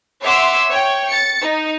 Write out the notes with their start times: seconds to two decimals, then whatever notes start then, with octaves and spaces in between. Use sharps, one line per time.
0.22 C#5 E5 F#5 C6 D6 E6
0.69 C#5 G5
1.09 A6 C#7
1.41 D#4